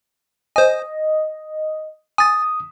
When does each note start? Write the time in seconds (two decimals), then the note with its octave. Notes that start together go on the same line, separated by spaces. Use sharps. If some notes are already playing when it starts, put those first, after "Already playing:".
0.56 C5 D#5 G#5
2.18 G#5 D#6 A6